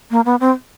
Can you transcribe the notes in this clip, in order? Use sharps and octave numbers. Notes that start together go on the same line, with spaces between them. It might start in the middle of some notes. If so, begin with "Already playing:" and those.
A#3
B3
C4